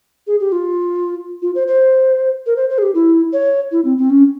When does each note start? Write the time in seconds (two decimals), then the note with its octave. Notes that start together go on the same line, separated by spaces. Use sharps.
0.27 G#4
0.40 G4
0.52 F4
1.42 F4
1.55 C5
1.67 C5
2.46 A#4
2.56 C5
2.70 C5
2.78 G#4
2.82 G4
2.94 E4
3.33 C#5
3.71 E4
3.85 C4
3.98 C4
4.10 C#4